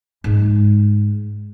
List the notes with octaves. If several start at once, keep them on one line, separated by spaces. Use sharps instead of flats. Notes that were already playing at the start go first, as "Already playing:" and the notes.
G#2 G#3